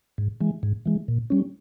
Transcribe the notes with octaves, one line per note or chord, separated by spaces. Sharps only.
G#2
E3 G#3
G#2
E3 G#3
A#2
G3 C#4